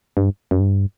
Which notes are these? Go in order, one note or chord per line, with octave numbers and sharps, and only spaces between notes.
G2
F#2
G2